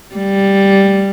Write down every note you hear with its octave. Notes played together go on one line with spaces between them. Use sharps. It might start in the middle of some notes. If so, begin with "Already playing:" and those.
G3